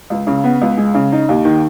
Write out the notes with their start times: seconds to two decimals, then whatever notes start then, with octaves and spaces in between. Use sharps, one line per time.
0.10 C#2
0.27 C#3
0.44 B3
0.62 C#2
0.77 G#3
0.94 C#3
1.12 D#4
1.29 D#2
1.45 D#3